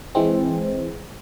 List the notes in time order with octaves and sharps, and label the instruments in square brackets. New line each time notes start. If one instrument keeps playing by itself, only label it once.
[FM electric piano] E3 G#3 C4